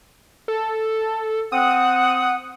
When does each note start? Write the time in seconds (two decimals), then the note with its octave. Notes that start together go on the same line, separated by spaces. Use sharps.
0.48 A4
1.52 C4 F#5 D#6